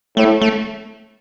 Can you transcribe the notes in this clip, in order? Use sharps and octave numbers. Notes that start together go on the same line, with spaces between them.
A2 A3
A3